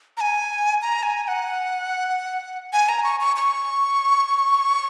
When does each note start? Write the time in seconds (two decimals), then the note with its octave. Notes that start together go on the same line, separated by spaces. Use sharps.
0.17 A#5
0.21 G#5
0.82 A#5
1.03 G#5
1.24 G#5
1.28 F#5
2.73 G#5
2.89 A#5
3.04 C#6
3.20 C#6
3.36 C#6